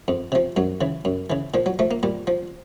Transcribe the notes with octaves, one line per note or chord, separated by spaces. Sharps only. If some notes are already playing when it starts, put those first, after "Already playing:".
F2
C3 F3
F#2 F#3
C#3 E3
F#2
C#3 E3
A#2 F3
F#3
F3 A3
A#3
A#2 G3
F3